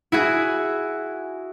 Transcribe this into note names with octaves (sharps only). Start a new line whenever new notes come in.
E4 F#4 G#4